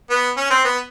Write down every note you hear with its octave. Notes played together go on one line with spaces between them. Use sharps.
B3
C#4
C4
B3